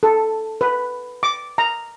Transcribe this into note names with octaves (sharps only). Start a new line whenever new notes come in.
A4
B4
D6
A#5